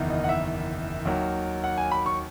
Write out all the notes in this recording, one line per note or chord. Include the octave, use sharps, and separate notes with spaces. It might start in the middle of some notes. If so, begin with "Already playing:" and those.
Already playing: F#1 E2 D#3
D#5
F#5
E5
D#2 D#3 F#3
F#5
G#5
B5
C#6